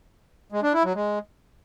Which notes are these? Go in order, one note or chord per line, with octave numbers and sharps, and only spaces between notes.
G#3
D4
E4
F#3
G#3